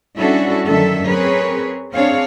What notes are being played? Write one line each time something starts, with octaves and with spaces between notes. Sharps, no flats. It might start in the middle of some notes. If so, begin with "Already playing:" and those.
G3 C#4 D4 E4 F#4 A4
F#2 D3 D#3 A4 E5
C4 G#4 A#4 B4 C#5
C4 D4 G#4 C#5 F5